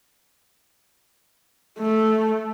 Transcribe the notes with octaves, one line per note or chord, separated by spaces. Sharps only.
A3